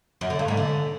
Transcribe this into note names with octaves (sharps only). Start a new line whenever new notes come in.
F#2
D3
G2
G#2
D3